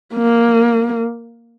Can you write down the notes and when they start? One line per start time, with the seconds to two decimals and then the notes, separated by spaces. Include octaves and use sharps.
0.15 A#3